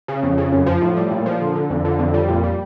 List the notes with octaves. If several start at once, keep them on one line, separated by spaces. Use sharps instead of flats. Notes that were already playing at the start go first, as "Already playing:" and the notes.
C#3
F2
C#3
F#2
F3
A2
G3
A#2
F3
D3
D3
F2
D3
F2
G3
A#2
G3